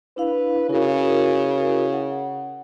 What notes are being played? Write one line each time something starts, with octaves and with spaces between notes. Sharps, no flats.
D4 E4 B4 F5
C#3 E4 F#4 A#4
F#5